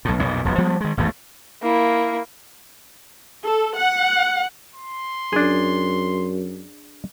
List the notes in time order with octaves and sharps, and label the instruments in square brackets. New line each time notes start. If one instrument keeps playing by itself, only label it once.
[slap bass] B1 A2
B1 F2 A#2
E1 B1 F2
F3 G3 G#3 B3
D#3 G#3
G#1 E2 G2 A3
[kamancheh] A#3 E4
[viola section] A4
F#5
[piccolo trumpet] C6
[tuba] F#2 [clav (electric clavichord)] D4 G#4